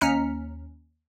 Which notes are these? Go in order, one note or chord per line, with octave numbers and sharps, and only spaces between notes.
D#2 C#4 A#5 F6 B6 C#7